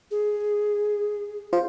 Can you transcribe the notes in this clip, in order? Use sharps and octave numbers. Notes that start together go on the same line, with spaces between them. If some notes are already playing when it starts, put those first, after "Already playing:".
G#4
F4 C5